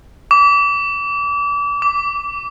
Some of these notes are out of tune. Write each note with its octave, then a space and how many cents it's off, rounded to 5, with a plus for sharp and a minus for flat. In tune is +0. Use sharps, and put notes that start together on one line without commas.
D6 -35
D6 -20